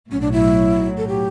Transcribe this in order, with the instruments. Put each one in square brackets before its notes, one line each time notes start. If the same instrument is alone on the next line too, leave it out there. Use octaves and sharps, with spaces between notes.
[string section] B1 A2 F#3 [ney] C#4
[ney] D4
E4
A4
G4